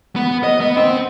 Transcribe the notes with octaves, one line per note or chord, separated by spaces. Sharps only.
B3
D#5
B3
C4